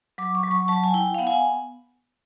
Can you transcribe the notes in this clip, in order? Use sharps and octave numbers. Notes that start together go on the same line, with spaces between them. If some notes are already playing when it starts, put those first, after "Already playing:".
F#3 D6
C#6
F#3
C#6
F#3 A5
G#5
E4 G5
F5
B3 F#5
G#5